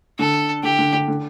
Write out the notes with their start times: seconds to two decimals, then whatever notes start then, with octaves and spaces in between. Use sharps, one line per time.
0.19 D3 A4
0.63 D3 G4
0.79 D3
0.93 D3
1.08 D3